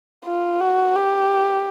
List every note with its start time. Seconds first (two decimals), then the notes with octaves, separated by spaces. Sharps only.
0.25 F4
0.61 F#4
0.95 G4